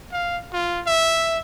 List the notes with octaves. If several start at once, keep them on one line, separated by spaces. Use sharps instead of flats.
F5
F4
E5